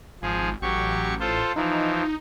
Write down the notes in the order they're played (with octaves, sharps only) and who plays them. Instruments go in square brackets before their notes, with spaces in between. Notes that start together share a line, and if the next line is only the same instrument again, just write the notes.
[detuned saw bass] G#1 [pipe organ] F3 G#4
[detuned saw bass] A1 [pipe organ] F#3 G4 C#6
[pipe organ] F4 A4 C5
[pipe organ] E3 F3 [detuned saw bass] D#4